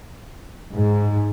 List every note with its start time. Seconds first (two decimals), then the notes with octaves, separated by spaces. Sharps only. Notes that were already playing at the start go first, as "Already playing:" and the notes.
0.73 G#2